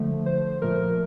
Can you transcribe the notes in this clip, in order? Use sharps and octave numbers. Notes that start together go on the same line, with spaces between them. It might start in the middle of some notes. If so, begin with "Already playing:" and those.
Already playing: D3 F3 A3
C5
A#2 F3 A3 A#4